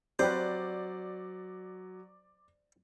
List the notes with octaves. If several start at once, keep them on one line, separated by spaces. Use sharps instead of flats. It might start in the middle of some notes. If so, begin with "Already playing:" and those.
F#3 C4 G4 B4 C5 D5